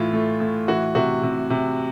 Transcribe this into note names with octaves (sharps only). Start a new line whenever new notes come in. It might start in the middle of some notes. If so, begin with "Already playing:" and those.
Already playing: A2 E3 F4
A3
A2
E3 F#4
C3 F#4
C3
C3